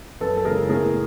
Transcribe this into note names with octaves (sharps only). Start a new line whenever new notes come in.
F#2 A4 B4
A4
C#3 E3 G#3 G#4 A#4
A2 G#4 A#4